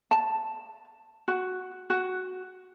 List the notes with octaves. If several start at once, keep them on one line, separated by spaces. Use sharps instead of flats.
A5
F#4
F#4